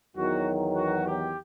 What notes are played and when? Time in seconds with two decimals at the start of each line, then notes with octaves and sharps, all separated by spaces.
0.16 E2 D#3 F#3 F#4
0.76 F#4
1.06 G4